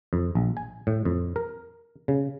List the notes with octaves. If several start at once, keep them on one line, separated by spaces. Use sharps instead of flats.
F2
A#1
G#5
A2
F2
A#4
C#3